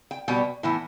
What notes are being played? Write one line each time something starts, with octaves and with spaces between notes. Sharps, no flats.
G5
B2 G3 B3 G5
A2 E3 B3 E4